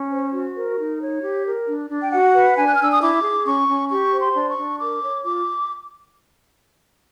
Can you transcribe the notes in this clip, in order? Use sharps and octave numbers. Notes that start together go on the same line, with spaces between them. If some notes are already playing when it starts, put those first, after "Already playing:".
Already playing: C#4
C5
F#4
A#4
D#4
C#5
G4
A#4
D4
D4
G5
F#4 F#5
B4
D4 G#5
F#6
F6
D4
E6
D#6
E4 D6
G#4
C#4 C#6
C#4
G4 C#6
C5
C6
D4
C#6
D4
A#4 D6
C#5
F4 D6